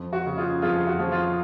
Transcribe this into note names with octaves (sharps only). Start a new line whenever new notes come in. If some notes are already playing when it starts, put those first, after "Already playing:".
Already playing: F2
F#4
C#3
F4 G#4
F2 F4 G#4
F#4
F3
F4